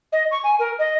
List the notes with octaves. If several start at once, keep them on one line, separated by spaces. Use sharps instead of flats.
D#5
C#6
G#5
A#4
D#5